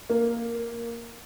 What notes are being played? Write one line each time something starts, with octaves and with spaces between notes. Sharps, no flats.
A#3